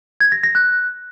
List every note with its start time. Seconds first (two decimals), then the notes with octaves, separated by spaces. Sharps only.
0.20 G#6
0.32 A#6
0.43 A#6
0.55 F#6